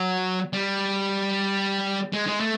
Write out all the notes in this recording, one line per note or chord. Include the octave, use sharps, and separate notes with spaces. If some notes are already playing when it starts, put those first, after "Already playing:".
Already playing: F#3
G3
G#3
G#3
A3